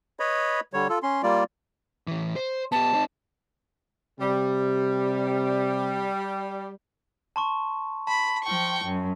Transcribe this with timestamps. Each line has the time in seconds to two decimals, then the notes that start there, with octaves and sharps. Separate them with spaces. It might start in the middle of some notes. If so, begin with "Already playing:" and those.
0.19 B4 C#5 D#5 B5
0.73 D3 G3 C#5
0.90 F4 A4
1.03 C#4 C6
1.23 G3 A#3 F4 D5
2.08 A2 E3
2.36 C5
2.72 B3 G4 A5
2.93 C4 D#4
4.20 C3 G3
7.36 A5 C6 C#6
8.07 A5 B5
8.44 F3 G5 C#6
8.81 F#2